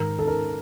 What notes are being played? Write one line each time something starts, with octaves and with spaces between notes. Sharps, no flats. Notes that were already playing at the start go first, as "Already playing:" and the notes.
Already playing: G#2 D#3 A#4
A4
A#4